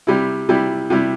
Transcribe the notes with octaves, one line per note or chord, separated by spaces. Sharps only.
C3 G3 E4
C3 G3 E4
C3 G3 E4